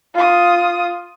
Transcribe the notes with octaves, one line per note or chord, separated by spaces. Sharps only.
F4 D#6